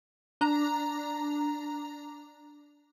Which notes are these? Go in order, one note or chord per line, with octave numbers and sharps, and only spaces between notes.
D4 A#5